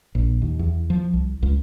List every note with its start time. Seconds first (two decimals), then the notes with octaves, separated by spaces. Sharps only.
0.15 A#1
0.42 D#2
0.59 E2
0.90 F3
1.14 C2
1.42 C#2